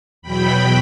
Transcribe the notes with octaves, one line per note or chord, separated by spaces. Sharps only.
E2 B2 F#3 G5 B5